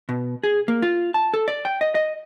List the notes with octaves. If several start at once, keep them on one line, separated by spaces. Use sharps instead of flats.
B2
G#4
A#3
F4
A5
A4
D5
G5
D#5
D#5